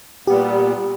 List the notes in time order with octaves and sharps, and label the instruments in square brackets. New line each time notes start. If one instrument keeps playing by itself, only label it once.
[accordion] A#2 G3 B3 [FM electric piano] G4